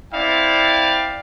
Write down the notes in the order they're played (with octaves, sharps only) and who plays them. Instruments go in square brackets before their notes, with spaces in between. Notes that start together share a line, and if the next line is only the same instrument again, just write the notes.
[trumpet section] C4 E4 D5 F5 G5